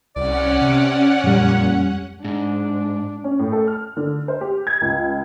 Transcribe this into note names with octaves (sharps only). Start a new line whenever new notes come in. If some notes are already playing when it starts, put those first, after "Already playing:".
C2 C#4 D5 F#5
C3
F2 A#2 G3
G#2 D4
C#4
A2
A4
F6
D3
C5
G4
G#6
C#2